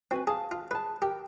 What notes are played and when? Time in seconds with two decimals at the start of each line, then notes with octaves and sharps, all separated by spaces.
0.11 C4 F#4 B4 G#5
0.27 G#4 F5 A5
0.51 F4
0.71 G#4 B4 A5
1.02 G4 A#4 G5